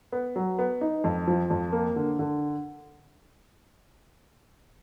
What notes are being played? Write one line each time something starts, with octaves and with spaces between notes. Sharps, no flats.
B3
F#3
B3
D#4
F2
F3
F2
A#3
D3
D3